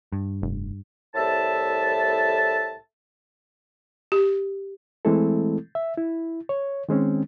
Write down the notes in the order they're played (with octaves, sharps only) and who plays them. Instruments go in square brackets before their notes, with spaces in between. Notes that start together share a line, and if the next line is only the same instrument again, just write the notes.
[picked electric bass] G2
[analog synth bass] F1
[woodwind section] C2 A2 A4 E5 A5
[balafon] G4
[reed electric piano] E3 G#3 A3 C4 E4 A4
E5
E4
C#5
D#3 G#3 C4 C#4